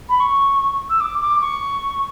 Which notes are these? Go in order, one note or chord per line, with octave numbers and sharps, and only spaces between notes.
B5
C#6
E6
D6
D6
C#6